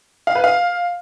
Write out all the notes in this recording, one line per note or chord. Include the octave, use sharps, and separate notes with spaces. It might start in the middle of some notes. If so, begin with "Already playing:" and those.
F5
B4
F5